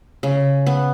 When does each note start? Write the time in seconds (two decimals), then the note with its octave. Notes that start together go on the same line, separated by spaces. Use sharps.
0.23 C#3
0.66 B3